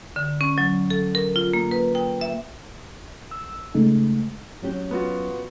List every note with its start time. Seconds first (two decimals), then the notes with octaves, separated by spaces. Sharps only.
0.16 D3
0.41 C#4
0.58 F#3
0.90 A4
1.15 A#4
1.36 F4
1.53 A#3
1.71 B4
1.95 G5
2.21 E5
3.31 E6
3.75 C#3 G#3 A3 D#4
4.62 F#3 C#4 G4
4.91 B3 F4 F#4